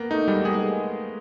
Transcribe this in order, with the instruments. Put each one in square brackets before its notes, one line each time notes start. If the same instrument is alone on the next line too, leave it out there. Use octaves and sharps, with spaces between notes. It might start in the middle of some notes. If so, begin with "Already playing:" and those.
Already playing: [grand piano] A#3 B3
[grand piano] A3 [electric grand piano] D#4
[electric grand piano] G3 [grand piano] G#3
[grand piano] G#3 [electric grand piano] G#4